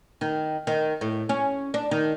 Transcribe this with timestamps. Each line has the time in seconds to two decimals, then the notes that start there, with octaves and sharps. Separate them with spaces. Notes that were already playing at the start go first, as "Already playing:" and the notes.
0.21 D#3
0.67 D#3
1.01 A2
1.29 C#4
1.74 D4
1.91 D#3